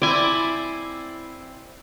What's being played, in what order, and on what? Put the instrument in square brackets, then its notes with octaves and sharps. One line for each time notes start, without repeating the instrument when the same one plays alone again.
[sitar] C4 E4 [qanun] D5 G#5